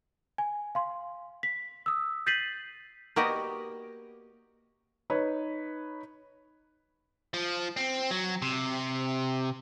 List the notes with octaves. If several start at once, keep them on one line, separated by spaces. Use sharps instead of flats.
G#5
F5 C6
B6
D#6 E6
G6 A6 B6 C7 D#7 F#7
A#3 B3 F#4 G4 D5 D#5
D#4 B4 C#5
F3
C4
F#3
C3